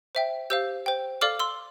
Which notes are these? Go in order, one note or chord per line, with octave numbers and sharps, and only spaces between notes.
C5 E5 G5
G4 C5 F5 E6 G6
C5 G5
A4 D5 F5 D6 F6
C6 E6